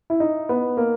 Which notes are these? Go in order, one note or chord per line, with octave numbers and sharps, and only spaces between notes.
E4
D#4
B3
A#3